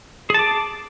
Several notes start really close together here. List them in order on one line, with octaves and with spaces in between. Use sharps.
G#4 A5 D6